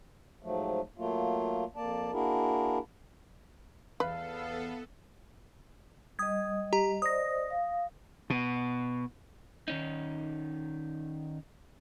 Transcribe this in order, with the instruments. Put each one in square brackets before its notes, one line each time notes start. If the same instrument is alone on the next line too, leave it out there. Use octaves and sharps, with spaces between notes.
[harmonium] G#2 F3 F#3 A3
F#3 A3 A#3 F4
F2 A#3 D5 A5
A#3 D4 E4 F#4 G#4 A#4
[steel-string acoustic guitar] E2 [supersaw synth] B3 A4 [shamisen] B4 [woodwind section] F5
[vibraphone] G3 D#5 [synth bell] D#6 G#6
[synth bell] G4 A#5
[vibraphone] C5 D5 D#5 [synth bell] D#6 A#6
[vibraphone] F5
[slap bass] B2
[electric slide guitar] D#3 C#4 D#4